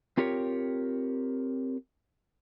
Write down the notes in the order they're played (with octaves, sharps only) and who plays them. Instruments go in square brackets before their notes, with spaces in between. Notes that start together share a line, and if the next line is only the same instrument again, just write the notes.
[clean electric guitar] C4 F4 G4 A#4 C#5